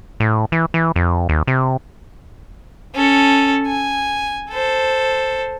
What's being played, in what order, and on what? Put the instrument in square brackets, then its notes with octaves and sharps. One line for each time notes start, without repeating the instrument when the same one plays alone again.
[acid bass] A2
E3
E3
F2
D#2
C3
[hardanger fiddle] C#4 A4
G#5
A4 C5